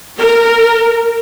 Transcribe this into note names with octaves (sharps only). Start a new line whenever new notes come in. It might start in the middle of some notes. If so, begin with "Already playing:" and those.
A#4